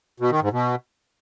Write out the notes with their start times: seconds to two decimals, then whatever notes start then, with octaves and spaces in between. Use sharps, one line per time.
0.20 B2
0.31 D#3
0.41 G#2
0.52 B2